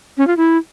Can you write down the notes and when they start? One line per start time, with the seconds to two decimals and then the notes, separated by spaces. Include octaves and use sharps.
0.18 C#4
0.27 F4
0.37 E4